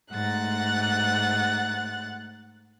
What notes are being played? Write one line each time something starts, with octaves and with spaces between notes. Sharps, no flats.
G#2 A3 F#5 F#6 A6